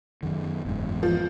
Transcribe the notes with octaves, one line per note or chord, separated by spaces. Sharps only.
F#2 D#3
F#1 E2 G#2
F3